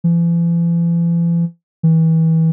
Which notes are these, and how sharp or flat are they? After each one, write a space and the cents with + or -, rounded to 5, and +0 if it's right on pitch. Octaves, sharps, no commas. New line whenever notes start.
E3 +45
E3 -30